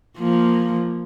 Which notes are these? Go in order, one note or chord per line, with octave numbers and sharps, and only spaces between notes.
F3 A#3